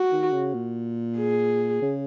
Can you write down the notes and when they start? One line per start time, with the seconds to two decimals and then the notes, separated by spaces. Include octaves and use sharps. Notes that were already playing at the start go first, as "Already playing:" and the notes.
Already playing: F#4
0.12 D#3
0.33 C#3
0.54 A#2
1.18 G#4
1.82 C#3